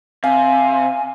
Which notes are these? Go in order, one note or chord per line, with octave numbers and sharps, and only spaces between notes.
C3 F5 G#5